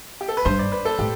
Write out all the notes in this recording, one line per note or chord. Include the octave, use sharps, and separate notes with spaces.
G4
A4
B4
G2 C5
D5
B4
A4
A2 G4